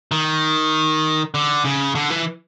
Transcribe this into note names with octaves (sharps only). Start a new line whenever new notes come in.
D#3
D3
C#3
D3
E3